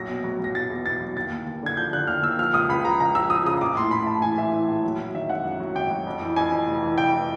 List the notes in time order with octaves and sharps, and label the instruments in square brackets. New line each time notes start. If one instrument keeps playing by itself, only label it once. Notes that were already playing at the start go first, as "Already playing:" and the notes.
Already playing: [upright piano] A#1 F#3 A#6
B2
F#3
F#3 A#6
B2 A6
E2
B2 A6
F#3
D#2 A6
D#2
D#2
D3 G#6
F3 G6
D3 F#6
D#2 F6
D#2 E6
F3 F6
C#2 D#6
C#2 B5
F3 A#5
C#2 A#5
F3 E6
F3 D#6
C#3 D#6
A#1 D6
A2 C6
A2 B5
A#1 A5
E3 G#5
E3 E5
E3
A#1
F#3
F#3
D#3 E5
G#1 F#5
F#2
F#3
G#1 G5
F#3
F2
E3
F2 G#5
F2
F1
E3
F1 G5
E3